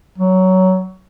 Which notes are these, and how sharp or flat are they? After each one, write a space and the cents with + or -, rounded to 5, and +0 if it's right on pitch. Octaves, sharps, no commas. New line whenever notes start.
F#3 +15